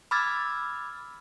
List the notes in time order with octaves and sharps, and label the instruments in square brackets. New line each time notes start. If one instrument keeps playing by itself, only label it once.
[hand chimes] B5 D6 E6 F6 G#6 A6